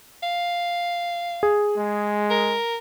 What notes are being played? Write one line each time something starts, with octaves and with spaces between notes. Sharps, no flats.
F5
G#4
G#3
A#4